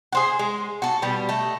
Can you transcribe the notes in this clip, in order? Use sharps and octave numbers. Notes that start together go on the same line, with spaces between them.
G#4 C5 F#5
G#3
F#4 A4
B2 G3
A3 D#5